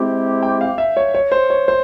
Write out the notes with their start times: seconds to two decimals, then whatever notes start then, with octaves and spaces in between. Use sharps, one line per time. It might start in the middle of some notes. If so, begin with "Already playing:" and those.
Already playing: G#3 C4 E4 G4
0.43 G5
0.61 F5
0.78 E5
0.97 C#5
1.15 C#5
1.32 C5
1.50 C#5
1.68 C5